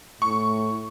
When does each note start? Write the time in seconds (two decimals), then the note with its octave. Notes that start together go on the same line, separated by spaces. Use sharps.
0.22 A2 C#6